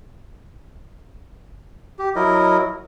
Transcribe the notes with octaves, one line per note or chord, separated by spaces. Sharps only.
G4
F#3 E4 A#4 D#5